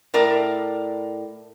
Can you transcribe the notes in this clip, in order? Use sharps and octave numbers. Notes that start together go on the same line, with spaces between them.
A2 A#4 D5